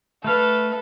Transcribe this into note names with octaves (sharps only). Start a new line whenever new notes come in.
A3 A4 B4 F5